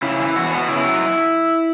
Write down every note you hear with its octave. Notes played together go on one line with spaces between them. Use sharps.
C#3 E4
E3
E2 F#4
B3
C#3 E4
F#3